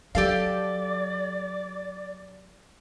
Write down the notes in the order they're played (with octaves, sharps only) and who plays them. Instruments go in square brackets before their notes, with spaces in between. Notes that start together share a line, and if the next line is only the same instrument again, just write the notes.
[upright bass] F#3 [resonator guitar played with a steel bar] G4 A4 F5 [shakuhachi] D5